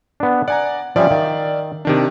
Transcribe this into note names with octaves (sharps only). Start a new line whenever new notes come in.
B3 D4
D5 F#5 G#5 A#5
F3 G3 C#4 D5 E5 F5
D#3
C3 D#3 D4